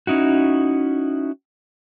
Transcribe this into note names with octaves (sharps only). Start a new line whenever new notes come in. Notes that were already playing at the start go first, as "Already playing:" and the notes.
C#4 D#4 E4 F#4